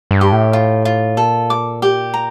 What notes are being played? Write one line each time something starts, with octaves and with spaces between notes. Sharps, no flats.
G2
G4
A2
F4
F4
A#2 A4
D6
G4
A#5